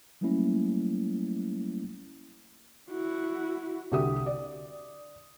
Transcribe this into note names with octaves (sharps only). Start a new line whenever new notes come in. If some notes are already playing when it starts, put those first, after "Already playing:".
F#3 G3 A3 A#3 C#4 E4
E4 F#4
C2 D3 F#4 G4 E5 D#6
D5